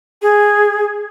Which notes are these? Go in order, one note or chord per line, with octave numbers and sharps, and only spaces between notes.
G#4